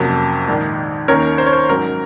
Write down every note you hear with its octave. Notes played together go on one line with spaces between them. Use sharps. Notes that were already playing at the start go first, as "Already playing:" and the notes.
Already playing: F2 C3 F#3 A#3 C#4
A#1 G#2 D#3
D#2 D#3 A#3 C#4 A#4 C#5
C5
C#5
C5
G#2 F#3 C#4 A#4